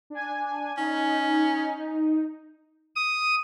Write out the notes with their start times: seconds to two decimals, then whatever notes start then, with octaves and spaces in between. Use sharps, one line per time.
0.10 D4 G#5
0.77 C#4 D#4
2.96 D#6